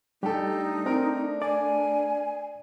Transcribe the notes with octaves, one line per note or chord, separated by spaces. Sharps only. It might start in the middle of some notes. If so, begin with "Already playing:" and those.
G3 A3 D4 D#4 G4 A4
C4 A#4
D5 G#5